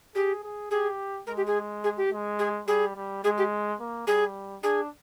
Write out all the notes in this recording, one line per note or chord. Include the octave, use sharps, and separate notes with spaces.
G4 G#4
G#4
G4 G#4
G#3 A#4
G4
G#4
G#4
G4
G#3
G#4
G3 G#4
G3
G#3 G#4
G4
A#3
G3 G#4
D4 G#4